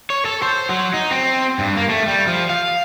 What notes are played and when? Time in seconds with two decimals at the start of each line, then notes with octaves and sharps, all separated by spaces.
0.10 C#5
0.26 A4
0.42 C5
0.69 F#3
0.94 D#4
1.11 C4
1.59 G2
1.77 A#3
1.90 A3
2.08 G3
2.27 F3
2.49 F5